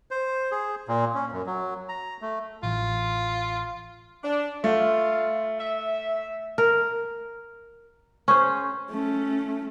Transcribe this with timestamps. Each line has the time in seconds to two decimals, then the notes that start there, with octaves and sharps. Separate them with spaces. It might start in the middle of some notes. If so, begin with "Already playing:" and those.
0.11 C5
0.52 G#4
0.88 A#2
1.15 C#4
1.32 F#2
1.46 F#3
1.89 A#5
2.22 A3
2.63 A1 E3 F4
4.24 D4
4.64 A3 F4
5.60 E5
6.58 A#4
8.28 C#4 G#4 C5
8.90 A3 C#4